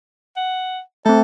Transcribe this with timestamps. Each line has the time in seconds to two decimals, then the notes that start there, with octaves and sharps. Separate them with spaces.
0.37 F#5
1.06 A3 C4 A4